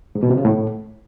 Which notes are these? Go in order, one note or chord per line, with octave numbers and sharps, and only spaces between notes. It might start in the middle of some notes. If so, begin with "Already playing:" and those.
G#2
B2
C3
C#3
A2